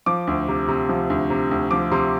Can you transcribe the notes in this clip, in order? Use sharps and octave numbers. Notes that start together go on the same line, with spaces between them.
F3 D6
D2
C3
C3
F3
D2
C3
D2
F3 D6
C3 C6